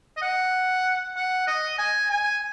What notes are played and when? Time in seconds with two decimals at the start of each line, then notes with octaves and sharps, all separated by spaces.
0.17 D#5
0.22 F#5
1.16 F#5
1.47 D#5
1.79 G#5
2.10 G#5